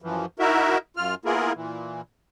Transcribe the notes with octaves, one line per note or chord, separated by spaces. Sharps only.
F#2 E3 F3
D#4 E4 F#4 A#4 E5
F#2 F4 F6
A#3 B3 E4 F4 G#4 A#4
A#2 E3